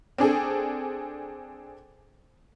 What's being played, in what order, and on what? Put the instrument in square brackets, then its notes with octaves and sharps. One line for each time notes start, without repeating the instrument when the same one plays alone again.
[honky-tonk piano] C4 D4 G#4 A4